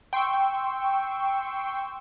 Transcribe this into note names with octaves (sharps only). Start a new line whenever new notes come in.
G5 C6 C#6 E6